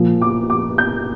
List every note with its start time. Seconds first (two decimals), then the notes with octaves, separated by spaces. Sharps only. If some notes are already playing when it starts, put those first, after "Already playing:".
Already playing: A#2 F3
0.22 D6
0.50 D6
0.78 G6